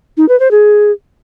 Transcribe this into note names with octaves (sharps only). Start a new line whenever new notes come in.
D#4
B4
C5
G#4